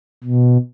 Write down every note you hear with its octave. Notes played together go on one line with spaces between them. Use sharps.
B2